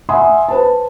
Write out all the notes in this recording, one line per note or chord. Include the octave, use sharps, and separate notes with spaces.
E5 F#5 G#5 C6 D#6
B4 C5 A5